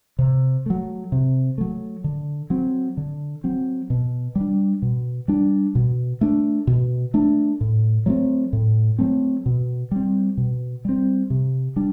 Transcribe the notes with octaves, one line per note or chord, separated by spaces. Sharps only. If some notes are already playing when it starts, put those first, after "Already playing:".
C3
F#3 A3
C3
F#3 A3
D3
F#3 C4
D3
F#3 C4
B2
G3
D4
B2
G3 D4
B2
A3 D4
B2
A3 D4
A2
F#3 A3 C4
A2
F#3 A3 C4
B2
G3 C4
B2
G3 C4
C3
G3 D4